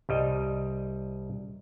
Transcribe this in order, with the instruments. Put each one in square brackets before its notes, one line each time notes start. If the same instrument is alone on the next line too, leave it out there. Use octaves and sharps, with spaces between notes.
[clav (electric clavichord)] C2 G3 D#5